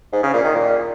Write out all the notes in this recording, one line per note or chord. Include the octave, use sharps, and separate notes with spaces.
G#2
C#3
A#2
D#3
A#2